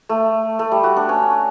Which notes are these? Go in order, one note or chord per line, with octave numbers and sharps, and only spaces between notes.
A3
A3
G3
F#4
D4
C#4